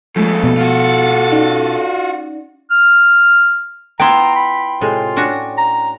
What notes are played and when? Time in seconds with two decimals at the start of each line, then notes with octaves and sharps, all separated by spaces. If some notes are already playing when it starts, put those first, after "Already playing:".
0.16 D#2 C#3 F3 G#3 A3 A4
0.44 B2
0.57 F4 F#4
1.31 C#4 D#4 D5
2.71 F6
4.00 B3 E4 F4 G5 A#5 C6
4.36 B5
4.81 A2 C3 G#3 F4
5.16 C#4 D4 F#4
5.58 A#5